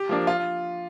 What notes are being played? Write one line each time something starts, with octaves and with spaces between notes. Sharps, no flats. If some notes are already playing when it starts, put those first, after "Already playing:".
Already playing: G4
F3 A#3 D4
F4